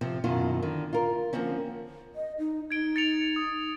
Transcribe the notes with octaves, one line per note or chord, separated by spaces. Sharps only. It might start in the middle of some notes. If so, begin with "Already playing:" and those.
C3 F3 C4
F#2 B2 D#3 E4 F4
D3 D#3
F4 A#4
D3 F3 A#3 C4 C#4
D#5
D#4
D#4 G#6 D7 G7
A6 C#7 F7
D#6